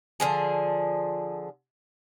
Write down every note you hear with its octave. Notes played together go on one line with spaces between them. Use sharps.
D3 F3 G#4